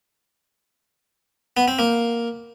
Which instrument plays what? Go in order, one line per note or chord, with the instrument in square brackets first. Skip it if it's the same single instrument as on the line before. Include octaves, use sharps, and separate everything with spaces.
[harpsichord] B3
C4
A#3